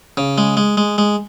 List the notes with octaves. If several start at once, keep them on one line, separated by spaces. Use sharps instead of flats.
C#3
G#3
G#3
G#3
G#3